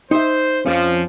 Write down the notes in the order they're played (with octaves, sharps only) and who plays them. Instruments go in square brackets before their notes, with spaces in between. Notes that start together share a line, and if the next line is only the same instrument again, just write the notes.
[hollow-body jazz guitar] D#4 E5 [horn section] C5
[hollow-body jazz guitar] F2 C#4 [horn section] F3